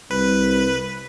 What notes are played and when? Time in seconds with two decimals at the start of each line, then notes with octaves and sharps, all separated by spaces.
0.11 C2 B4